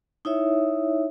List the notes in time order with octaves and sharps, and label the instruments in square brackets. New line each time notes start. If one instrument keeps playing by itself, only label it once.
[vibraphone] D#4 E4 C#5 E5